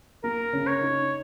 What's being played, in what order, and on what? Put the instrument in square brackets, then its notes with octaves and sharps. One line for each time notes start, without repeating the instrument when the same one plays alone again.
[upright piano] A#3 [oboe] A#4
[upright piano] C#3
[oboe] C#5
[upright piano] D#4